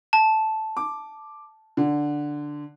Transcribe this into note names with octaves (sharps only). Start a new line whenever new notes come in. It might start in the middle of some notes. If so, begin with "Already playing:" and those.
A5
D6
D3